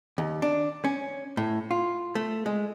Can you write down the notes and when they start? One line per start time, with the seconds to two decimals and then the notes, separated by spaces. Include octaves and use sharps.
0.18 D#2
0.42 D4
0.84 C#4
1.37 A2
1.71 F4
2.15 A3
2.46 G#3